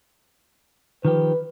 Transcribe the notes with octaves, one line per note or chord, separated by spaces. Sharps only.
D#3 F3 G4 B4